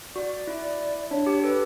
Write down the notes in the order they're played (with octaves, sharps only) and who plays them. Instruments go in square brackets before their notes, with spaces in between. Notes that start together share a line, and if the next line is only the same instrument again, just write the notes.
[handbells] F#4 [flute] D5
[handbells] E4
[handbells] D4 [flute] C#5
[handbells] G4
[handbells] A4 [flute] B4